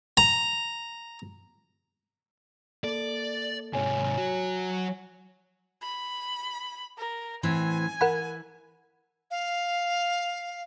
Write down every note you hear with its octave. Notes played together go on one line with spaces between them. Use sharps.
A#5
A#3 A4 D5
G#2 C3 C#5 G#5
F#3 F#4
B5
A#4
A2 E3 C4 G#5
E3 A#4 F#5 B5
F5